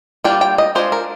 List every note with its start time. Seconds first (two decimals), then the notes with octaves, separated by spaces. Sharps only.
0.24 G3 A#3 D4 F4 G5
0.41 G5
0.58 D#5
0.75 G#3 D4 F4 C5
0.92 A#4